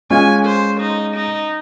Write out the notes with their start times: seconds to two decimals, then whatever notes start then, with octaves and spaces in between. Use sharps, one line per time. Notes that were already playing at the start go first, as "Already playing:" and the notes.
0.10 G#3 C#4 F4 G#5
0.45 C5
0.81 D#4
1.16 D#4